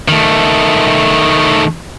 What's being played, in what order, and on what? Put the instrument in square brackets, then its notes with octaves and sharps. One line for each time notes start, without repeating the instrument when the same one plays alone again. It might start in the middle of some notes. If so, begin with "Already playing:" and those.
[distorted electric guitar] D#3 A3